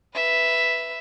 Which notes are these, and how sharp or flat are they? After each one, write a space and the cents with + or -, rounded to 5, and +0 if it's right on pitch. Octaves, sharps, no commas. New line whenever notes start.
B4 +0 E5 +0